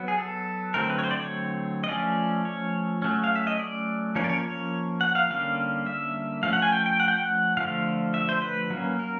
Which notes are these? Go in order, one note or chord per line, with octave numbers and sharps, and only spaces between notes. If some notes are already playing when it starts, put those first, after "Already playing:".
Already playing: F#3 B3
G#4
A4
D3 F#3 A3 C4 A#4
B4
C#5
C5
D5
C#5
D#5
F3 A3 C#4 D5
C#5
F#3 A3 C#4
F5
E5
D#5
D5
F3 A#3 C#4 C#5
D5
C#5
C#5
F#5
F5
D3 G3 A#3 C#4 F5
E5
F3 A3 C#4 F5
F#5
G#5
G5
G5
F#5
G5
F#5
D3 F3 A3 F5
E5
C5
B4
F#3 A#3 C#4
A#4